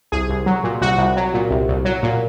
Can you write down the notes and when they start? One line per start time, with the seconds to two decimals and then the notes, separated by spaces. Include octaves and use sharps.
0.12 C2 G#4
0.29 C2
0.46 F#3
0.64 A#2
0.81 C2 F#4
0.98 C2
1.17 F#3
1.34 A#2
1.51 C2
1.68 C2
1.85 F#3
2.03 A#2